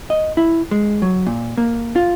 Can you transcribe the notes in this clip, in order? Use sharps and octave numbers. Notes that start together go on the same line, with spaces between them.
D#5
E4
G#3
F#3
A#2
A#3
F4